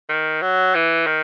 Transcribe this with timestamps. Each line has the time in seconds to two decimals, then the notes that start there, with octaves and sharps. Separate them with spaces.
0.09 D#3
0.42 F#3
0.75 E3
1.07 D#3